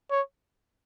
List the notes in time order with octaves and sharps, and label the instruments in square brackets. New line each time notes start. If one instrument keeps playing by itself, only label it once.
[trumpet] C#5